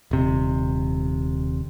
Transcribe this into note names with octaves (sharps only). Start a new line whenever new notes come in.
D#1 C3